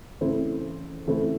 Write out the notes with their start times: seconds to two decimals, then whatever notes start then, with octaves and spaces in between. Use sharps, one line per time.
0.21 C#3 E3 A3 C4 E4
1.07 C#3 E3 A3 C4 E4